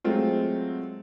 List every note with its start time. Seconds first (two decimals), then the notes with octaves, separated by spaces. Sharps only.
0.04 F#3 G#3 A3 C4 F4